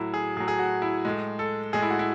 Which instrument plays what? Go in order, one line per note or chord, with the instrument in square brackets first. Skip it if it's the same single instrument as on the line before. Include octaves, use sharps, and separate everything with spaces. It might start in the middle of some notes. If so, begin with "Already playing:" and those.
Already playing: [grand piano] A2 F#3 E4
G#4
A2 G#4
F#3
G#4
F#4
E4
A2 G#3
A4
A2 G#3 G#4
E4
F#4
E4